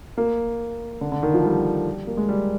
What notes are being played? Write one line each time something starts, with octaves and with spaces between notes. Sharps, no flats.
A#3
D3
D3
D#3
F3
G3
A#3
G#3
G3